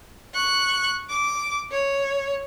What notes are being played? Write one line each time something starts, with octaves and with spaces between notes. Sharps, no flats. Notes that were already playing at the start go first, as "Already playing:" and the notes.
C#6 F#6
D6
C#5